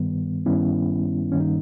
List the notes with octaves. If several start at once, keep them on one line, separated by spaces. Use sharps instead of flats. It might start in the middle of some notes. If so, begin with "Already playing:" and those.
Already playing: G2 D#3 G3 B3
G2 D#3 G3 B3 C#4 E4
G2 D#3 G3 A#3 C#4
D#4